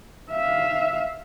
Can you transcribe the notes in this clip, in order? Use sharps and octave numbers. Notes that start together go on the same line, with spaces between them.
E5 F5